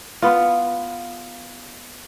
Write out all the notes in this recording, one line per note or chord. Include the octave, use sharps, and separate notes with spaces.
B3 F4